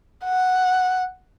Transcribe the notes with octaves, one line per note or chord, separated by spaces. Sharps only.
F#5